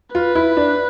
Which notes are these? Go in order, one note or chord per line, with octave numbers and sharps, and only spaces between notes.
F4 B4
E4
D4